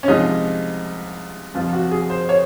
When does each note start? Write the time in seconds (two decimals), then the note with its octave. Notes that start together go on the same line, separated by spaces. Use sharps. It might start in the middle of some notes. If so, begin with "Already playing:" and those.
0.03 C#4
0.08 C2 C3 F3 G#3 D#4
1.54 F2 C3 F3 F4
1.73 F#4
1.91 G#4
2.10 C5
2.29 C#5